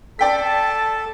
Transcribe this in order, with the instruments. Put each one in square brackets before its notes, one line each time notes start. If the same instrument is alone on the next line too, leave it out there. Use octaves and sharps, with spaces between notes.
[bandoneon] A4 [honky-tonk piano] D5 G5 B6 [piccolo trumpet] A5